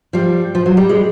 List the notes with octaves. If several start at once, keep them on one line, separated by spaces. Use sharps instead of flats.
F3 G3
F3
F#3
G3
G#3